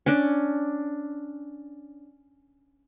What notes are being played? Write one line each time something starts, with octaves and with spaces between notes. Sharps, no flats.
C#4 D4